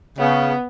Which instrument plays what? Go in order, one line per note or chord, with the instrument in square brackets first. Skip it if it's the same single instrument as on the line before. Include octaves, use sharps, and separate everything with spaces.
[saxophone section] C#3 [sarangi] B3